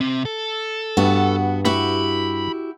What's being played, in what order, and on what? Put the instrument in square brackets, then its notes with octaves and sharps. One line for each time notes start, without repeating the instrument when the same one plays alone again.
[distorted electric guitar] C3
A4
[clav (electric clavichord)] G2 [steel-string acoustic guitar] B3 F#4
[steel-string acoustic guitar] E4 F#4 G4 [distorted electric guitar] B5